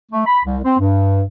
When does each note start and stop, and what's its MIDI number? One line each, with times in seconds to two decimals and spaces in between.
0.12 0.24 57
0.26 0.40 83
0.45 0.57 36
0.65 0.76 60
0.79 1.22 43